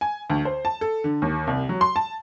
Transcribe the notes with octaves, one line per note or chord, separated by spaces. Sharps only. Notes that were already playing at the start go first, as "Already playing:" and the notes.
G#5
D2
C5
A5
A4
D3
D#2
C2
F#3
C6
A5